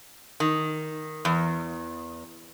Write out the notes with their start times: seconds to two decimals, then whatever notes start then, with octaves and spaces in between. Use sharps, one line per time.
0.40 D#3
1.25 E2